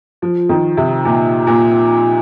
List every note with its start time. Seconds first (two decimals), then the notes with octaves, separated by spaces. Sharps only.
0.22 F3
0.49 D#3
0.77 C3
1.05 A#2
1.47 A#2